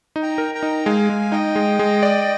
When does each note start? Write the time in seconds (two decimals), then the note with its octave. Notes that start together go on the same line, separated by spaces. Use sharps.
0.16 D#4
0.22 G5 A#5
0.38 A#4
0.54 G5 A#5
0.63 D#4
0.86 G#3 F5 G#5
1.09 G#3
1.32 D#4 D#5 G5
1.55 G#3
1.79 G#3
2.03 D5